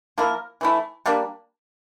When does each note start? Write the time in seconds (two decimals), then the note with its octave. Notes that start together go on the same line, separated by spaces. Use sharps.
0.18 F3 A#3 E4 A#4
0.61 E3 A3 E4
1.06 G3 A#3 D4